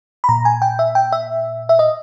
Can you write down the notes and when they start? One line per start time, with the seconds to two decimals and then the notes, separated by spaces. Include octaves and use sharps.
0.24 B5
0.29 A#2 A#5
0.45 G#5
0.62 G5
0.79 E5
0.95 G5
1.12 E5
1.69 E5
1.79 D#5